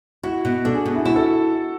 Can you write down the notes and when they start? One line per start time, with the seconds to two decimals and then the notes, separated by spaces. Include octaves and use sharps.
0.23 E4 F#4
0.45 B2
0.65 D4 A4
0.75 G#4
0.85 B2
0.95 E4
1.05 E4 F#4
1.16 A4